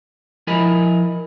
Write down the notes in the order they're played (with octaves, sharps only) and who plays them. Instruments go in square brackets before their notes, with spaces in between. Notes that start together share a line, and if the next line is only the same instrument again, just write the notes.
[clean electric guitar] F3 E4 A#4 D#5 G#5 B5